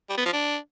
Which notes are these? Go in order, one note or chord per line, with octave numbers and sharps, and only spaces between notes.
G3
B3
F3
D4